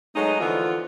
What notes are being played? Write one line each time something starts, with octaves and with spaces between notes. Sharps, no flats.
F#3 G#3 A3 B3 D#4
D3 E3 F3 B3 F4